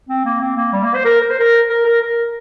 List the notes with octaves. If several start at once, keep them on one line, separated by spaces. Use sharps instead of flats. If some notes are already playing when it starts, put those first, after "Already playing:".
C4
A#3
C4
A#3
G3
A#3
C5
A#4
A#4
C5
A#4
A#4
A#4
A#4